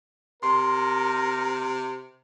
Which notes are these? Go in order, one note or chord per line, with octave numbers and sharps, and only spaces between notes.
C3 A#4 C6